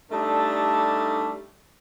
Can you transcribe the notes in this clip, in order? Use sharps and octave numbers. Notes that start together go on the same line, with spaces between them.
G3 A3 D4 D#4 A4 D5